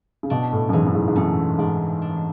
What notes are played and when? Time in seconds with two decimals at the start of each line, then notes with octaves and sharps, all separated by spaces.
0.23 C#3
0.30 B2 D4
0.53 A2
0.69 F#2
0.73 G#2 E3
0.86 F#2
0.95 G#2
1.08 G#2
1.16 F#2 A3
1.58 G#2 D4
2.02 D4